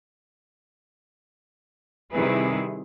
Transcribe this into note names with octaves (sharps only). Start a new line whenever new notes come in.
C3 D#3 G3 E4 G#4 B4